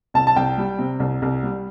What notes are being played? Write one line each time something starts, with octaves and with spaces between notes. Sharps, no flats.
C2 A5
A5
C2 G5
G3
C3
C2
C2
G3